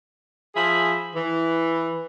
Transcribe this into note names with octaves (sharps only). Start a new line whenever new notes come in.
F3 G#4 E5 G#5 B5
E3